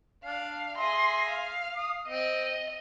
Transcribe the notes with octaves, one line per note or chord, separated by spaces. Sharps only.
D4 F5
G#4 E5 C6 A#6
F5
D#6
C4 D#5